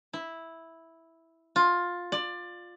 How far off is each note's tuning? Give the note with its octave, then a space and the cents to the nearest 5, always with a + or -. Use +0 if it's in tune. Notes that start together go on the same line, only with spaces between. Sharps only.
E4 -5
F4 +15
D5 +20